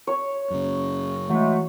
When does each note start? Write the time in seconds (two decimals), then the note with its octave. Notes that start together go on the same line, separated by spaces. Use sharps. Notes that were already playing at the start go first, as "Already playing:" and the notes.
0.07 C#5
0.50 F#2 C#3
1.29 E3 F#3 G#3 A3